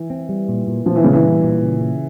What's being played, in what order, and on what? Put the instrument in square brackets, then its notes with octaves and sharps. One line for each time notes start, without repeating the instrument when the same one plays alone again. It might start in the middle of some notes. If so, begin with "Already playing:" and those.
Already playing: [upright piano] E3
[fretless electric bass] C4
G3
A#2
A#2
[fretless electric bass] A#2 [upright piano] F3
[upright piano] E3
[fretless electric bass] A#2 [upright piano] C#3
[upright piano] E3
[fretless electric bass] G3
A#2
C#3
C#3